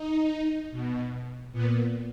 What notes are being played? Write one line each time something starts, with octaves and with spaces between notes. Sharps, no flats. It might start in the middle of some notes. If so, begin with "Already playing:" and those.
Already playing: D#4
B2
A#2 B3